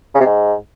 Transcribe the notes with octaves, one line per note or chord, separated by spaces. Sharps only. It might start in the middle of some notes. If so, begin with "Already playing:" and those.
C#3
C3
G#2